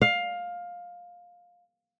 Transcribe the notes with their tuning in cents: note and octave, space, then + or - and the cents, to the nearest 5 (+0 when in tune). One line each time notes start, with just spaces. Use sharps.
F5 +15